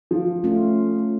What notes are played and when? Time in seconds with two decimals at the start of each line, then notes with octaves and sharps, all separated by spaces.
0.11 F3
0.44 A3 C#4 F4